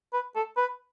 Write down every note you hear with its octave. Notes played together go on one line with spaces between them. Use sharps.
B4
A4
B4